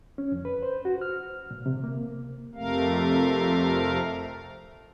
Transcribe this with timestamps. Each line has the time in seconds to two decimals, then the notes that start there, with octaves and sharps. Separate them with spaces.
0.18 C#4
0.32 F2
0.45 B4
0.63 C5
0.85 F#4
1.01 F6
1.51 A#2
1.66 C3
1.84 A#3
2.55 F2 C3 A3 A#4 F5